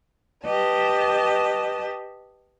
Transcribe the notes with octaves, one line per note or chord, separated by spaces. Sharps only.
G4 B4 D#5 A5